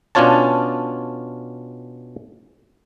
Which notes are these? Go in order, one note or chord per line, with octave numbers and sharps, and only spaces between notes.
B2 C#4 D4 F4 C#5 A5